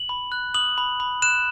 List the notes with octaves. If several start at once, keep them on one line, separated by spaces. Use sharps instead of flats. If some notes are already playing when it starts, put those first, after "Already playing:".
Already playing: F#7
B5
F#6
D#6 F#7
B5
B5
F#6 E7